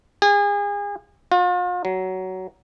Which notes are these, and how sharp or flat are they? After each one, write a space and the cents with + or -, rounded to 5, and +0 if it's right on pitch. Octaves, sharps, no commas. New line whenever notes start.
G#4 -35
F4 +40
F#3 +15